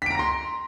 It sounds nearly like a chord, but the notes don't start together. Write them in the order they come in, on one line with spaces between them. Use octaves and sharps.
B6 D7 A#5 A#6 C6